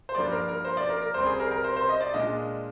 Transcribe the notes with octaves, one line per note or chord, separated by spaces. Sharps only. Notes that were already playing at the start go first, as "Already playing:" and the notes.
C5
G2 F3 A#3 D5
A#4
A#4
C5
D5
A#4
A#4
C2 C3 G3 C4 C5
G#4
A#4
A#4
C5
C5
D#5
D5
A#2 G#3 D4 F4 D#5